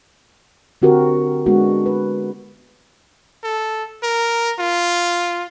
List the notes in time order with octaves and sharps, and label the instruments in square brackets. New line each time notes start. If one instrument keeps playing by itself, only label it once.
[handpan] D3 C4 F#4 G4 A#4
G#3 B3 D4 F#4
B4
[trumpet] A4
A#4
F4